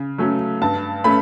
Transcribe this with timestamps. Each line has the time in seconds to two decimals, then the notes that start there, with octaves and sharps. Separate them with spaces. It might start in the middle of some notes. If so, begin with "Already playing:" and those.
Already playing: C#3
0.18 F#3 A3 C#4
0.62 G2 A5
1.04 A3 C#4 B5